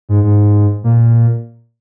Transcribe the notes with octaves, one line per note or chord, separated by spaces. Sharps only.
G#2
G#2
A#2